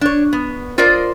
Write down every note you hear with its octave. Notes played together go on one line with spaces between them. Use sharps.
D4 C#5
B3
F4 A#4 C5 D5 D#5